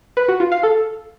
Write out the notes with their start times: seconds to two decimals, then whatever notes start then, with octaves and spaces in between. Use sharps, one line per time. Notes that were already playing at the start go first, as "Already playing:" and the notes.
0.17 B4
0.28 F#4
0.40 F4
0.52 F5
0.63 A4